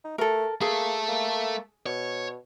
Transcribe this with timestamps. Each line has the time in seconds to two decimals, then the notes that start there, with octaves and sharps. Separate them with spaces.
0.04 D#4
0.18 A3 A4 A#4
0.61 A3 A#3 G#4 A4
1.08 A#3
1.86 B2 C#5